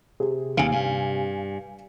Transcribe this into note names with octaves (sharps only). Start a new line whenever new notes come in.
C3 G#4
D#2 C#3 F5 G#5
G2